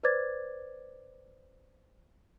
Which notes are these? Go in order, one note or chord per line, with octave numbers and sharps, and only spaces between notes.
B4 C5 D5 D6 G#6 A6